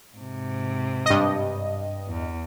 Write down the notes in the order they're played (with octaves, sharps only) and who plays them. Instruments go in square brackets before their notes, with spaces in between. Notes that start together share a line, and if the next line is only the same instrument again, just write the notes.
[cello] G#2 C3
[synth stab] G2 D#5
[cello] E2